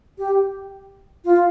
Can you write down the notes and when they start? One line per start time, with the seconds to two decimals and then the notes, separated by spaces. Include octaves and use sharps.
0.18 G4
1.25 F4